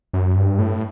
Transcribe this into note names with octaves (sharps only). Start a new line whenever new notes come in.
F#2
G2
A2